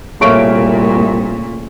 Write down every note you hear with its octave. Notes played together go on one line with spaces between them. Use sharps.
C2 A#2 C#3 A3 A#3 C#6 D7